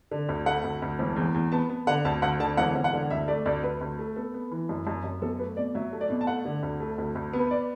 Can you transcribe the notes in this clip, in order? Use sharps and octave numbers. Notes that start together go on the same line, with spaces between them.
D3
D2
A3 F#5
D2
D2
E1
E2
E2
B3 A5
B3
D3 F#5
D2 A5
D2 F#5
D3 A5
E1 F#5
E1
F#5
D3
D2 E5
A3 D5
D2 D5
D2 B4
D2
A3
B3 A4
B3
E3
F#2
F#2
F#2
B1 A4
A3 B4
B2 D5
F#3 E5
A3
D5
B2
A5
A3 F#5
D3
D2
A3
D2
D2
B3
B4
D5